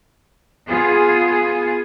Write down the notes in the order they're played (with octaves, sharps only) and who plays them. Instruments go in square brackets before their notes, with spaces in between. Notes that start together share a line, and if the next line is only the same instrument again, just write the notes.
[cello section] B3 F4 G#4